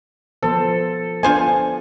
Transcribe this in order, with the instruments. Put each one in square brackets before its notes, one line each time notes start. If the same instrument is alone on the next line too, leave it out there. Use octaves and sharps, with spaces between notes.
[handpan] F3 B3 C5 [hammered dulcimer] A4
[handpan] B3 D4 [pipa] F4 C5 G#5